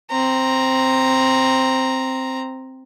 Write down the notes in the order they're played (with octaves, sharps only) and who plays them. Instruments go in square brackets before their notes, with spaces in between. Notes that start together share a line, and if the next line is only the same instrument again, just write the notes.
[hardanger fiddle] C4 A#5